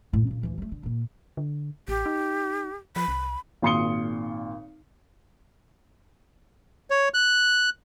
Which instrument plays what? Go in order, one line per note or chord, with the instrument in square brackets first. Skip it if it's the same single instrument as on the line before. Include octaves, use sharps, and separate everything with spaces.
[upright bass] A2 D#4
A#2 C#3
D2 E3
G3 A3
D3
A#2 A#3
[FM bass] D3
[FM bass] A1 [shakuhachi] G4
[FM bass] D#4
[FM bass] F3 [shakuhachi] B5
[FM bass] C2
[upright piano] G#1 A#2 C6 D#6 C#7 G7
[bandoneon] C#5
F#6